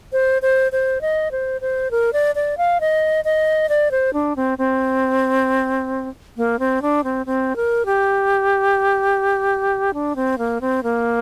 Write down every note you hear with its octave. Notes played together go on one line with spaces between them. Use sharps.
C5
C5
C5
D#5
C5
C5
A#4
D5
D5
F5
D#5
D#5
D5
C5
D4
C4
C4
A#3
C4
D4
C4
C4
A#4
G4
D4
C4
A#3
C4
A#3